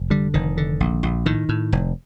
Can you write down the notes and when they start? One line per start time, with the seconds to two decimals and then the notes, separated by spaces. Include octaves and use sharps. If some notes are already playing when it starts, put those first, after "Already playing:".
Already playing: F1
0.10 D3 G3
0.34 F1 D#3
0.57 D3
0.80 A#1
1.03 A#1
1.26 A2 D#3
1.49 A2
1.72 F1